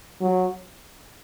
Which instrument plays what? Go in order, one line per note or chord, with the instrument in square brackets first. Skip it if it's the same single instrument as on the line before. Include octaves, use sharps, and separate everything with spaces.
[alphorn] F#3